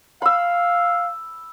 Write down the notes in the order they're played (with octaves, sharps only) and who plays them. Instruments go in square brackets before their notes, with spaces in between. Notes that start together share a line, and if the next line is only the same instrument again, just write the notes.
[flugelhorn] F5 [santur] B5 E6